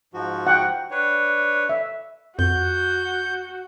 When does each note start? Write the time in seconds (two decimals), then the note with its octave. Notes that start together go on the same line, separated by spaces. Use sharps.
0.14 G#2 F3 F#4
0.47 F#5 G5
0.91 D4 B4 C#5
1.69 E5
2.39 F2 F#4 G6